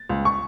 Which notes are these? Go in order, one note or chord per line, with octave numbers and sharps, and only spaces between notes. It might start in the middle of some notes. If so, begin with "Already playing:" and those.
Already playing: A6
C#2
C#6